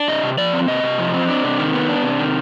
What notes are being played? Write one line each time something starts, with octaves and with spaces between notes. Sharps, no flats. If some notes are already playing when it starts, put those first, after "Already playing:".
Already playing: D4
C3 D#5
C3
F3 D5
C4
C3 D#5
C3
F3
C4
D4
C3
D#3
B3
D4
C3
D#3